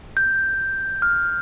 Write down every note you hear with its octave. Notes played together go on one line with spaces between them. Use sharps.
G6
F6